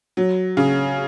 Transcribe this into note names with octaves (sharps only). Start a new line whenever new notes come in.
F#3
C#3